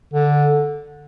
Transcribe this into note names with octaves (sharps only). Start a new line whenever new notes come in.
D3